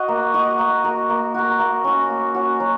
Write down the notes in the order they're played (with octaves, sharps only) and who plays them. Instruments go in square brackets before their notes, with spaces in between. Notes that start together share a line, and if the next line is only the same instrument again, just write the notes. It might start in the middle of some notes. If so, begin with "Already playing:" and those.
Already playing: [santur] F#4 D#5
A#3
F#4 D#5
A#3
F#4 A#4
A#3
F#4 A#4
A#3
C#4 F#4
A#3
C#4 F#4
F#3